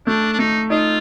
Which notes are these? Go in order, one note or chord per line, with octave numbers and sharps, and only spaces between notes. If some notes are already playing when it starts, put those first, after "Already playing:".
A3 D4
D4
A3 D#4
D#4 F4